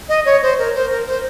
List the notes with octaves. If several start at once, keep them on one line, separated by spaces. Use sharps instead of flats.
D#5
C#5
C5
A#4
C5
A#4
C5